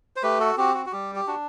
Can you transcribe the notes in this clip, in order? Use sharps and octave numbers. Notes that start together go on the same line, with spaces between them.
C5
A3 G4 B4
F#4 A4
C4 F#4 G4
F#4
F#4
G3 G4
G4
D4 F#4